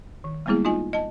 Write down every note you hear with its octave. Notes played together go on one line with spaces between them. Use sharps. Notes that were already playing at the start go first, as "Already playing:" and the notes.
D#3
G3 G#3 A#3 B3 E4 G#4
D#4 F4 D#5 G#5
D#5 A5